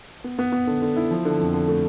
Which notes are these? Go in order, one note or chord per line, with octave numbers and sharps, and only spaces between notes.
B3
B3
B3
D3
D3
E4
F3
D3
F2
D3
A3